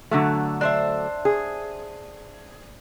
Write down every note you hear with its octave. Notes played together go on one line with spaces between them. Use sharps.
D3 F#3 A3
D4 C5 E5
G#4